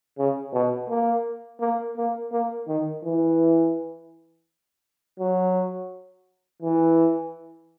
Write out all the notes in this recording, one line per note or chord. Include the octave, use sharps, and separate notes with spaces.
C#3
B2
A#3
A#3
A#3
A#3
D#3
E3
F#3
E3